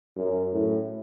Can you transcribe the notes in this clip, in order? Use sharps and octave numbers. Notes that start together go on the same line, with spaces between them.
F#2
A2